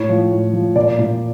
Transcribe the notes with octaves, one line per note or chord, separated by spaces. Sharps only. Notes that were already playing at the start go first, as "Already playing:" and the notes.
Already playing: A2 C#5
F3
A2
F3
A#2 D5
A#2